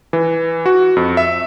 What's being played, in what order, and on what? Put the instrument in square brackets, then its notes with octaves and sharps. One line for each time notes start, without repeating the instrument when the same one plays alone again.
[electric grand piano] E3
F#4
F2
E5